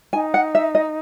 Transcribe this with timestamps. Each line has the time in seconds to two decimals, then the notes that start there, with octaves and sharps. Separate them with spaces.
0.13 D#4 G#5
0.34 F#5
0.55 E5
0.75 D#5